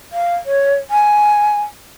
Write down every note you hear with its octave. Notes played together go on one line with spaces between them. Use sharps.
F5
C#5
G#5